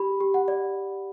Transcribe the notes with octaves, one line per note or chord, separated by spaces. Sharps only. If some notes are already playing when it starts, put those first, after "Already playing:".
Already playing: G4 B5
G4
F#5
D5